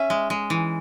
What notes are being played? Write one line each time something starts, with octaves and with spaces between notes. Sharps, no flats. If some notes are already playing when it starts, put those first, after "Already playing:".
Already playing: C#4 E5
G#3
G#3
E3